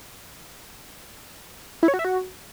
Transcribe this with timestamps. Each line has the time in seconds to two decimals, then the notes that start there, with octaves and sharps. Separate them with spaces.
1.83 E4
1.88 C#5
1.94 F#4
1.99 E5
2.05 F#4